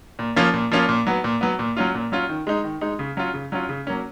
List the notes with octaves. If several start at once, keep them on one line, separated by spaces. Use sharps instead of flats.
A#2
F3 A#3 C#4 F4
A#2
F3 A#3 C#4 F4
A#2
F#3 B3
A#2
F#3 B3
A#2
F#3 C#4 F4
A#2
F#3 C#4 F4
D#3
G#3 D#4
D#3
G#3 D#4
C#3
F#3 C#4 F4
C#3
F#3 C#4 F4
C#3
F#3 A#3 C#4